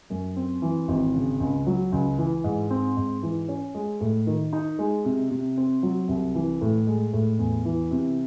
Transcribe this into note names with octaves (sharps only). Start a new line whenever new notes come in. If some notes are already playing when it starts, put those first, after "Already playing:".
F#2
C4
E3
G#1
C#3
C#2
F#3
C#2
E3
G#2
C4
G#2
E3
C#4
G#3
A2
D#3
D#4
G#3
C3
C3
C4
F#3
C2
E3
A2
G#3
A2
E2
E3
C3